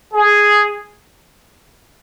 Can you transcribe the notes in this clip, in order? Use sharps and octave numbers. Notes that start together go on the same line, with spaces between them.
G#4